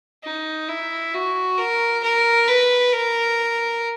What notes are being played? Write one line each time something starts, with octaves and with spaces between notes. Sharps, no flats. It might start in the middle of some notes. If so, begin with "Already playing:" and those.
D#4
E4
F#4
A#4
A#4
B4
A#4